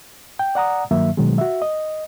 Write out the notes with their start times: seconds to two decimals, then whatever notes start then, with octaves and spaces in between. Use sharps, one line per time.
0.39 G5
0.55 D5 F#5 A#5 D#6
0.91 G2 D#3 F#3 A#3 E5
1.17 B2 D#3 F#3 G#3
1.38 F#4 E5
1.62 D#5